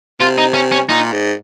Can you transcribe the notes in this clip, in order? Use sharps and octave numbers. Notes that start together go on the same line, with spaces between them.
C3 F4
D#4
C#4
C#4
A#2 D#4
G#2